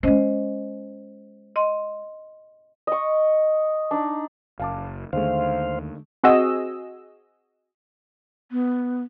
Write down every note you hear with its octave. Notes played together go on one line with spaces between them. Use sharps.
G#3 C#4 C5 D#5
D#5 C6
D#5 C#6
D4 D#4
F#1 F5 A5 D6
D#2 D3 G#3 A3 C5 F5
C4 F#4 G#4 D#5 E6
B3